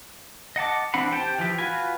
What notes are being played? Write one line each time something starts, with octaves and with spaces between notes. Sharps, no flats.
D#5 F#5 A5 D6
E3 C4 D4 F#5 B5
G4 C5 G5 A5
E3 F3 G4
F4 F#4 B4 G#5